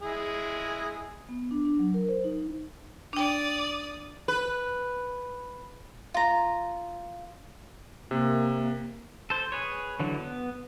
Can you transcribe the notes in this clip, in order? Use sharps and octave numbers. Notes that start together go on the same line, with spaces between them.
G#3 E4 G#4
B3
D4
D4
F#3
A#4
C5
D#4
D4 D5 G5 D#6
B4
F4 A#5
C3 A#3
A4 C5
G#4 B4 C#5
D3 E3 F#3
B3